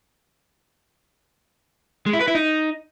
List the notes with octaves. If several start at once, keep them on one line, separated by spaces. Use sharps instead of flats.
G#3
E4
B4
E4
D#4